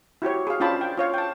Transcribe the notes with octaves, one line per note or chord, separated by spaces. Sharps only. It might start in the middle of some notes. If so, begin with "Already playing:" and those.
E4 F#4 G4 C#5
G#4 F5
C#4 D4 F4 G5 A5 B5
G5
F4 C#5 F5
G5 A5